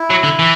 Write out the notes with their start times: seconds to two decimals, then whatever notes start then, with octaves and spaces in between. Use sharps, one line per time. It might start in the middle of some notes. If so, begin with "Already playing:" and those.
Already playing: E4
0.10 F#3
0.24 D3
0.39 E3